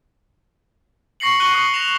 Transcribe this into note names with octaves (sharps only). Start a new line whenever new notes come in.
C#6 A#6 C7 C#7 F#7
C#6 F#6 A#6 C#7 D#7 G7
C#6 D#6 C#7
A#6 E7 F7